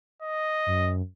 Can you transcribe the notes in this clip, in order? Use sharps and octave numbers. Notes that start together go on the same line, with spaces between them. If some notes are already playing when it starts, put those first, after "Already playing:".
D#5
F#2